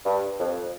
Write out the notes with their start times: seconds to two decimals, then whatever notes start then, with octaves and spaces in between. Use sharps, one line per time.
0.06 G2
0.40 F2